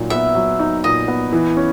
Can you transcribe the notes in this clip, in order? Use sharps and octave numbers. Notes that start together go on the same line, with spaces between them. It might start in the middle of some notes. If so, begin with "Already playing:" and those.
Already playing: A#2 F#3 D#4
B3 E5
F#3
D#4
A#2 D#5
B3
E3
C#4